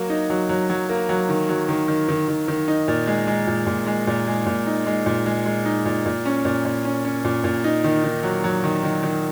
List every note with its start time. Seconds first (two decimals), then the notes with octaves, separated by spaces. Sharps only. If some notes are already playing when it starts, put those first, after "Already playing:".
Already playing: F#3 A#3
0.10 D#4
0.30 F#3
0.49 F#3
0.70 F#3
0.89 A#3
1.09 F#3
1.29 D#3
1.49 F#3
1.69 D#3
1.88 D#3
2.09 D#3
2.28 D#3
2.48 D#3
2.68 D#4
2.88 A#2
3.07 G#3
3.27 G#3
3.47 A#2
3.67 A#2
3.87 G#3
4.07 A#2
4.27 G#3
4.46 A#2
4.67 D#4
4.86 G#3
5.06 A#2
5.26 G#3
5.46 G#3
5.65 D#4
5.86 A#2
6.06 A#2
6.25 C#4
6.45 A#2
6.65 A#2
6.85 C#4
7.05 C#4
7.25 A#2
7.44 A#2
7.64 D#4
7.84 D#3
8.04 D#3
8.23 F#3
8.44 F#3
8.64 D#3
8.83 D#3
9.03 D#3